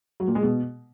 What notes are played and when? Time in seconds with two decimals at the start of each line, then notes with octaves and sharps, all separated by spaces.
0.20 F#3
0.28 A#2
0.35 G#3
0.43 B2